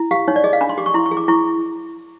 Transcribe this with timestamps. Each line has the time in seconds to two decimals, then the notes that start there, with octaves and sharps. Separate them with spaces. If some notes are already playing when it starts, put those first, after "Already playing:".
Already playing: E4
0.11 G4 F5
0.28 D#4 C#5
0.36 D5
0.44 G#4 D#5
0.53 F5
0.61 D4 B5
0.69 C6
0.78 G4 D6
0.86 C#6
0.94 E4 C6
1.06 C#6
1.11 G#4
1.17 D6
1.28 E4 C#6